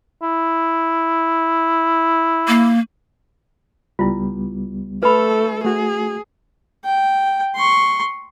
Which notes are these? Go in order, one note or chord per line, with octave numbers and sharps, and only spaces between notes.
E4
A#3
C#2 G3 B3 E4 F4
A3 A4 B4 B5
A3 F#4 G#4
G5
C6 C#6